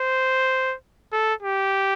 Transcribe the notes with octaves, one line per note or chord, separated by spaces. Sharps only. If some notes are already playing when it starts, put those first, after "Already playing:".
Already playing: C5
A4
G4